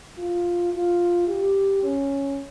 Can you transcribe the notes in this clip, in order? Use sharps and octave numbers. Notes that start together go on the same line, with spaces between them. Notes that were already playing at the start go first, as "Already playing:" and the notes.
F4
F4
G4
C#4